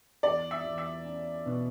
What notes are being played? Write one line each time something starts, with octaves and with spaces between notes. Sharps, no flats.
E2 D5
E5
E2
E5
C#4
B2